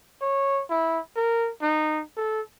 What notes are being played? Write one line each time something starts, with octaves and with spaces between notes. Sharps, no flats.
C#5
E4
A#4
D#4
A4